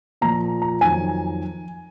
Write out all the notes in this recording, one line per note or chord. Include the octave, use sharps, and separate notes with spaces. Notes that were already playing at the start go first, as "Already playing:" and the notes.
A#2 F3 A#5
A#5
F2 D#3 F#3 G#5